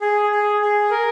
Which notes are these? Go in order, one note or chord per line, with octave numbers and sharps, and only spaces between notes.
G#4
G#4
G#4
A#4